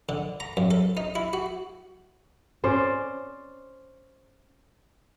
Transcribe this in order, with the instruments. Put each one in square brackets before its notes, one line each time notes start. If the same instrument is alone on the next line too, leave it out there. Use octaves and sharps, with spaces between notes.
[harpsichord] D3
A#5
F#2
A4
D#4
E4
F#4
[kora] C#4 C5 D5